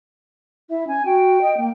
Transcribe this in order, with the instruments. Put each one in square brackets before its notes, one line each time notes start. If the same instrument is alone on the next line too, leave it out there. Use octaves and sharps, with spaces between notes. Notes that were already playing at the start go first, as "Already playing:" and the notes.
[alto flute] E4 [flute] E5
[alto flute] C#4 [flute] G#5
[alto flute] F#4 [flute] G5
[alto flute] D#5
A#3